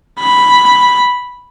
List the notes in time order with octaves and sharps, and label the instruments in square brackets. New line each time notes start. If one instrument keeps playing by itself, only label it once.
[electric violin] B5